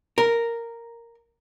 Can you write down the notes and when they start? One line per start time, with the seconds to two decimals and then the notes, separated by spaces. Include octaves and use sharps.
0.18 A#4